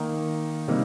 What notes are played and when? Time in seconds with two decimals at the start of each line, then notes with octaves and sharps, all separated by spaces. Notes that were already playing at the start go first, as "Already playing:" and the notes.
Already playing: D#3 A#3 D#4
0.68 C3 G3 A#3 D#4